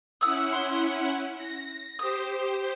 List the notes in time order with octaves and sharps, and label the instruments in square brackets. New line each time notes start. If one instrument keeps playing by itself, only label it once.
[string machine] C#4 E4 F#5 [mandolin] D#6 E6
[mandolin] C6
[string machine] A#6
[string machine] G4 C5 [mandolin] D#6